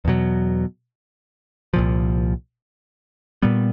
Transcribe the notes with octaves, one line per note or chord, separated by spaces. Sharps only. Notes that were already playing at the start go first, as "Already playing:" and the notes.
E2 B2 F#3
C2 A#2 F3
A#2 G3 B3